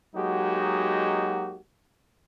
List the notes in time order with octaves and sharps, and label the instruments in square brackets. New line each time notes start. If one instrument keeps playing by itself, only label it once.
[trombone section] F#3 G#3 A#3 D#4 F#4 G4